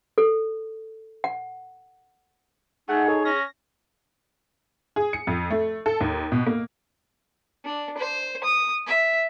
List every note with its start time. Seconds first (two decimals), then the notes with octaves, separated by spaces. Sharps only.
0.18 A4
1.24 F#5
2.89 A3 D#4 G#4 F#5
3.08 A4 C#5
3.25 C#4 A#6
4.96 G#4
5.13 C#7
5.27 F2
5.50 A3
5.86 A4
6.01 D#2
6.32 B2
6.47 A#3
7.65 D4
7.98 C5
8.44 D#6
8.87 E5